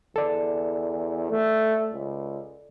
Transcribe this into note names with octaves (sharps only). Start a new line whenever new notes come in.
E2 A4 D5
A3
C#2